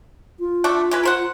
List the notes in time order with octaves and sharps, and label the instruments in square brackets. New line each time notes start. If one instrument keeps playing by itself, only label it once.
[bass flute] F4
[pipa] A3 D4 F#4
E3 G#3 B4
A#4 C5 F#5